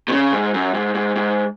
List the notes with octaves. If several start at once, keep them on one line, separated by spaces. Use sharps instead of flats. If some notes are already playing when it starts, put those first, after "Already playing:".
B2
C#3
G#2
F#2
G#2
G#2
G#2